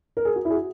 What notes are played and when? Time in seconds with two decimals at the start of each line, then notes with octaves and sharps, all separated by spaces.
0.17 A#4
0.25 G#4
0.36 F#4
0.45 E4
0.50 G#4
0.55 F#4